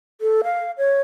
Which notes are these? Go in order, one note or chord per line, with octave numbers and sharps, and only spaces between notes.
A4
F5
C#5